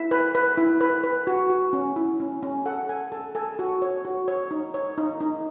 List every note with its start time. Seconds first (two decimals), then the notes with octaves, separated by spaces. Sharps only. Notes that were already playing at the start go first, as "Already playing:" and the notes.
Already playing: E4 E5
0.11 B4
0.35 B4
0.57 E4
0.81 B4
1.03 B4
1.27 F#4
1.50 F#4
1.73 C#4
1.96 E4
2.20 C#4
2.43 C#4
2.66 A4 F#5
2.89 A4 G#5
3.12 A4 A5
3.35 A4 G#5
3.59 F#4
3.82 C#5
4.05 F#4
4.28 C#5
4.51 D#4
4.74 C#5
4.98 D#4
5.20 D#4